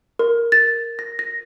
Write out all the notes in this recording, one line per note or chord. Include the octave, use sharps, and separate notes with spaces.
A#4
A6
A#6
A#6